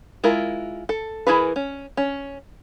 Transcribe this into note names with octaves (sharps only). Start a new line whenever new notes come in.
G#3 E4 F4 A#4
A4
E3 E4 G#4 A#4 B4
C#4
C#4